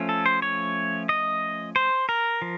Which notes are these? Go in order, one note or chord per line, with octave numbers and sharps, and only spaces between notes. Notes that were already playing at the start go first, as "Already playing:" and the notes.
Already playing: F3 A3 C#4
A4
C5
C#5
D#5
C5
A#4
F3